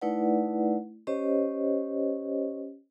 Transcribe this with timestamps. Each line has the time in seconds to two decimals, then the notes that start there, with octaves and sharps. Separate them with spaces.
0.01 A3 D#4 E4 B4 D5 F#5
1.07 C#4 G4 C5 C#5 D#5